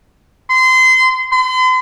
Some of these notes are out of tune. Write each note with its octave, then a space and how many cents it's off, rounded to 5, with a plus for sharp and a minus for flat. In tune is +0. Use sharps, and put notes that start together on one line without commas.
C6 -25
C6 -45